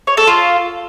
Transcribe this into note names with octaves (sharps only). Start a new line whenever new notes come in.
C#5
A4
F4